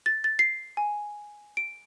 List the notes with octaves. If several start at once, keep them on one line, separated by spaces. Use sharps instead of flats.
A6
A6
C7
G#5
D7